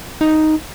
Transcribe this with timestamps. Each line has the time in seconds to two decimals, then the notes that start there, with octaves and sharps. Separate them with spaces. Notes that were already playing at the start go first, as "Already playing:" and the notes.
0.21 D#4